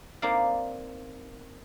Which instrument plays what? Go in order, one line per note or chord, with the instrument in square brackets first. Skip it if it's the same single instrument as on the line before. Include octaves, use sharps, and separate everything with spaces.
[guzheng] A#3 C4 D#4 D5 F5